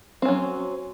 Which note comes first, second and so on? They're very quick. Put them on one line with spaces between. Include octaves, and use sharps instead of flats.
C4 C#4 F#3